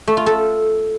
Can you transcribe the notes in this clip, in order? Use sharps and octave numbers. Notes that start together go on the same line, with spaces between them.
A3
F4
A4